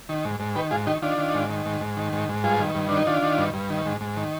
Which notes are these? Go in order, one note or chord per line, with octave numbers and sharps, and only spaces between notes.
D#3
G#2
G#2
D#3 G4 B4
G#2 F4 G#4
D#3 D#4 G4
D#3 D4 F4
D#3
G#2
D#3
G#2
G#2
D#3
G#2
G#2
G2 F4 G#4
D#3
G2
D#3 D4
D#4
D#3 D4 F4
D#3
G2
G2
D#3
G#2
G#2
D#3